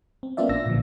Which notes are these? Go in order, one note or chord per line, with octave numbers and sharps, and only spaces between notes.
C4
A#3 B3 C#4 F4 D5 E5
A1 D4 E6 A#6
A#2 D3 F3